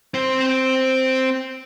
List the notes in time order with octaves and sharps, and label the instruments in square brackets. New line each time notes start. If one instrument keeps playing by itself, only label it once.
[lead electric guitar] C4 C5